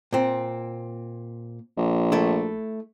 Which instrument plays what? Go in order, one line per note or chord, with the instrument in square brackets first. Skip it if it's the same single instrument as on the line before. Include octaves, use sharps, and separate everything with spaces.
[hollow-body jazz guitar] A#2 C4
[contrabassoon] A#1
[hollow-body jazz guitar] A3 E4